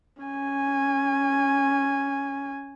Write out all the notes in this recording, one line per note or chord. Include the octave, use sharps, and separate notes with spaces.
C#4 G#5